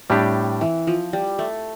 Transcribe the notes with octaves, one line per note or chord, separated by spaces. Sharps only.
A2 G3 C4 D4 G4
E3
F3
G3
A3